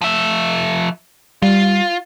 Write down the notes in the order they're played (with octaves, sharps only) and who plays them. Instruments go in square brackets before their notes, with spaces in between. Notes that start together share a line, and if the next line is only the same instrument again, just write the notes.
[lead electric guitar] F3 E5
[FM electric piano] G3 [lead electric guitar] F4